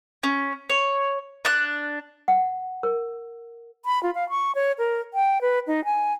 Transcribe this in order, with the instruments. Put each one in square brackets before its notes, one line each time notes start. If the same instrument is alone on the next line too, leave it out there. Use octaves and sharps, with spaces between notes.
[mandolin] C#4
C#5
D4 F#6
[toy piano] F#5
A#4
[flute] B5
F4
F5
C#6
C#5
A#4
G5
B4
D#4
G#5